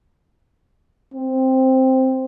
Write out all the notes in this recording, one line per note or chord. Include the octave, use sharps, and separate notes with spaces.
C4